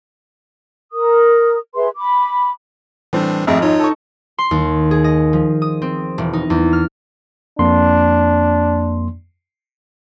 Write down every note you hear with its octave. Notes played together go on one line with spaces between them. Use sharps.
A#4 D#6
G#4 B4 E5 C6
B5 D6
A2 E3 G3 C4 D4
G#1 F2 A3 C4 G#4 E5
D#4 F4 C#5
A4 D#5 C#6
C6
D#2
G#4
D#5
F3
D#6
C4
E1
D#4
E2
F6
F2 A#3 D4 C6